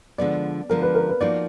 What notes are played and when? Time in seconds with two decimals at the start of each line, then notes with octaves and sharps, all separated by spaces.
0.18 D3 F3 G#3 B3 D5
0.69 D3 F3 G#3 B3 A#4
0.82 B4
0.95 A#4
1.09 B4
1.20 F3 A#3 D#4 F#4 D5